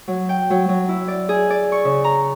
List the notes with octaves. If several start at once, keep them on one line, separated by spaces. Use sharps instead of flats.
F#3
G5
F#3
F#3
E4
D5
G#4
D5
C#6
C#3
A#5